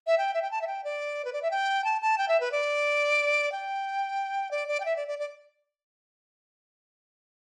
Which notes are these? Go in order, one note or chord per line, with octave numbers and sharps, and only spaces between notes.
E5
G5
E5
G5
A5
E5
G5
D5
B4
D5
E5
G5
A5
A5
G5
E5
B4
D5
G5
D5
D5
G5
E5
D5
D5
D5